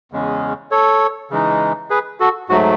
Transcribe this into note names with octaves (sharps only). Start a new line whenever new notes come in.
E2 C#3 G#3 C#4
A4 C#5
C#3 E3 G#3 D#4
G#4 B4
F#4 A4
G#2 F#3 A3 F#4